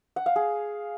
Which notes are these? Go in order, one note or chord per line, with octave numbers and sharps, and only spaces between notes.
F#5
F5
G#4